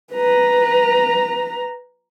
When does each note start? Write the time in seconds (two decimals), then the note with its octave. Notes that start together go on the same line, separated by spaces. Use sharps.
0.13 B4 A#5